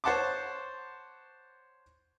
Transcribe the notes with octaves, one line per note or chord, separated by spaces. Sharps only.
C5 C#5 F#5 A5 C6 D6